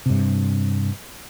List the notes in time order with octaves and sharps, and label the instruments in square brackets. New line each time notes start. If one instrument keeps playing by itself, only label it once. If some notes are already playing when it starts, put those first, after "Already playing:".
[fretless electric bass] G2 C3